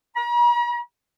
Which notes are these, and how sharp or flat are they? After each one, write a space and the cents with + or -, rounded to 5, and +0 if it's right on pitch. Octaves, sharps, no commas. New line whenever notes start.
A#5 +45